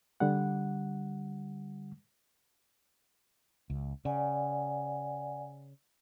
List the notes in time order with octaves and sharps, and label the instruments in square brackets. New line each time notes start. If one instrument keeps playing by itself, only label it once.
[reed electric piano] D3 G3 F#5
[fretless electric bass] C#2
[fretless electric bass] C#3 [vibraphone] D5 F#5 G#5